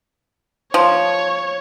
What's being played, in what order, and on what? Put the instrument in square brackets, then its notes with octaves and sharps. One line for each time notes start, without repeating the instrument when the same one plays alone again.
[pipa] F3 [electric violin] C#5